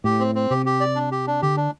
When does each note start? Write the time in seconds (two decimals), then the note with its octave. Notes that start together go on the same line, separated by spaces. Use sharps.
0.04 A2 G4
0.20 C4
0.35 C4
0.50 C3 G4
0.66 G4
0.80 D5
0.96 D4
1.12 G4
1.27 D4
1.42 D3 G4
1.57 D4